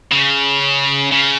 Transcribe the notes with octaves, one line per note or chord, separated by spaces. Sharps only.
C#3
C#3